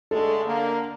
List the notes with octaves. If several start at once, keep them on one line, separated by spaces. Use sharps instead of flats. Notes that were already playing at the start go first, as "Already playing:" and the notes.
D3 G#3 A3 A4
D3 A#3